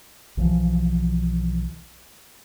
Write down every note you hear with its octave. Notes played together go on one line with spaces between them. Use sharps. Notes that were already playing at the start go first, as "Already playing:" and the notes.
B1 E3 F3